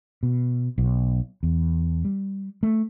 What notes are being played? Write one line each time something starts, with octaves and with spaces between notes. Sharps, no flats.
B2
B1
E2
G3
A3